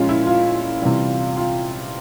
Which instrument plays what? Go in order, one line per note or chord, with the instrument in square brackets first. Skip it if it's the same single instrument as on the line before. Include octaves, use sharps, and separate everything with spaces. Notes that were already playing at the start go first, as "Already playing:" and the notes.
Already playing: [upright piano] A#2 F3 G#3 C#4 F4
E4
F4
C3 E3 G3
F4